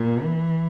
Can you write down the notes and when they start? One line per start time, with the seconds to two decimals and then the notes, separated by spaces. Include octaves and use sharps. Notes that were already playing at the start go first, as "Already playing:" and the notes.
Already playing: A#2
0.24 E3